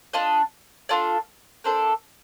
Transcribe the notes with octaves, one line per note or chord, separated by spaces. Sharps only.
D4 F4 A4 D#5
D4 F4 A4 D5
A#3 D4 A4 C5